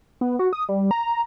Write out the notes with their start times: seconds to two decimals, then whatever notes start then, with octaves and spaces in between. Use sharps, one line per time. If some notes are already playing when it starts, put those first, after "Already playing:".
0.21 B3
0.39 F#4
0.53 D#6
0.69 G3
0.91 A#5